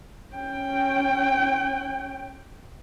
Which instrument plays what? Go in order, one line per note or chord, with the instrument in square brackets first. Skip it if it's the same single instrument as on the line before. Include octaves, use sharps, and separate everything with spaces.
[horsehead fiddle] C#4 G5